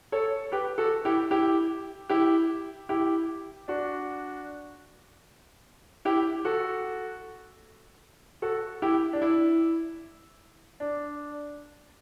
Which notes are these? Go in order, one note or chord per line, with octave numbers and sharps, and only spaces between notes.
A4 C#5
G4 B4
F#4 A4
E4 G4
E4 G4
E4 G4
E4 G4
D4 F#4
E4 G4
F#4 A4
F#4 A4
E4 G4
D4
E4
D4